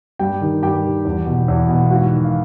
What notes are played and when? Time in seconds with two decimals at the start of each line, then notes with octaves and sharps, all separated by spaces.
0.19 G2 G4 G5
0.41 D#3
0.63 G2 G4 G5
0.84 D#3
1.05 E2
1.26 B2
1.48 E2
1.69 B2
1.85 F5
1.90 G#2 F#4 F#5
2.12 D#3
2.25 F5